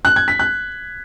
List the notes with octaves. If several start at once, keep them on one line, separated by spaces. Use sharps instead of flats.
F#6
G#6
B6
F#6